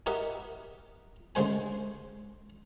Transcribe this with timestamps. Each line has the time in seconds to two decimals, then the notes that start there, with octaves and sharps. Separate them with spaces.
0.06 E4 G4 A#4 B4 D#5 F#5
1.35 D2 C#3 G#3 C5 G#5